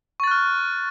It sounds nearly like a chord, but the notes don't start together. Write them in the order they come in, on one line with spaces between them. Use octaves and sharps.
C#6 A6 F#6 F6